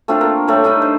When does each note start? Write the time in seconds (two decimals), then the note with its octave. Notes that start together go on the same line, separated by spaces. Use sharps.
0.08 A3 C4 D4 F4
0.21 A#3 A#4
0.48 G3 A3 C#5
0.64 D4 D#4 D#5 B5
0.82 C5